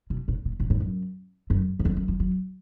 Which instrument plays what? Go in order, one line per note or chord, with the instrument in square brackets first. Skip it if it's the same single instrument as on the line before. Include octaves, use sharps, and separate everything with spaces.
[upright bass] B2
A#2
A#2
A#2
G#2
F#2
F#2
F#2
F2
F#2
F3
F#3